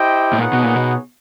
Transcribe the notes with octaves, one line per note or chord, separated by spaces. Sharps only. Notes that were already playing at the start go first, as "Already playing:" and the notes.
Already playing: E4 G4 C5 D#5 G5
A2
A#2 B3 D#4 G#4 C#5 F#5
B2
A#2
B2